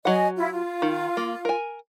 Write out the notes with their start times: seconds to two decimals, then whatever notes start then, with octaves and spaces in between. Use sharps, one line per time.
0.05 F#3 D#5 F#5 G#5
0.36 E4 F4
0.52 F4
0.82 D#3
1.17 A#3
1.45 A#4 G#5